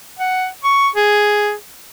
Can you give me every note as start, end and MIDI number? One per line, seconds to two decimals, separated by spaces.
0.19 0.47 78
0.64 0.88 85
0.96 1.53 68